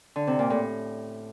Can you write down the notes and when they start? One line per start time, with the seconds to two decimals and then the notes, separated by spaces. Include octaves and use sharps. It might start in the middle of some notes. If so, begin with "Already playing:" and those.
0.16 D3
0.27 C3
0.39 A#2
0.50 A2